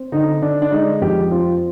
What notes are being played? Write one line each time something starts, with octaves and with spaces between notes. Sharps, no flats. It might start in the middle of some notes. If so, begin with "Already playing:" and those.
Already playing: C4
D3 D#4
D3 D4
D4
G#3 D#4
F2 G4
C4 F4